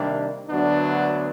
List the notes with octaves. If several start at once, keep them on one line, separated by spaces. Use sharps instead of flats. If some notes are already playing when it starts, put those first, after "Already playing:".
Already playing: C3 D#3 G3 A#3 D4
D2 D3 F#3 B3 D4